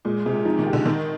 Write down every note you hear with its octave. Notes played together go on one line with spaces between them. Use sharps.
A#2 G#3
C3 G#3
F3 D#4
D#3
G4
D3
D#3 A#4